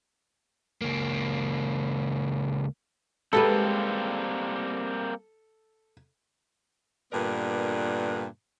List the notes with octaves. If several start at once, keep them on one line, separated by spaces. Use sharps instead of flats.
C#2 A#3
G3 G#3 A#3 C4 G4 A4 B4
G2 A#2 D3 B3 A#4 D5